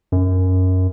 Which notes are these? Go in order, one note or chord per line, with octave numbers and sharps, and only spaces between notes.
F#2